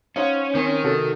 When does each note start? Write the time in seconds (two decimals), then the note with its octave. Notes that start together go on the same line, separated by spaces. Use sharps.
0.16 C#4 D#4 C5 D#5 F5 F#5
0.55 D#3 C4 G#5
0.84 C3 F#4 A4